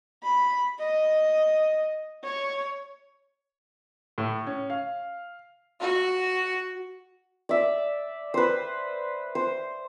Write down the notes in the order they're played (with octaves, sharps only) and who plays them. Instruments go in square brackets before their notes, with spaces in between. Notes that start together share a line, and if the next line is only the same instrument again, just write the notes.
[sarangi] B5
D#5
C#5
[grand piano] A2
C#4
F5
[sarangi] F#4
[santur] D5 E5
B4 C5
C5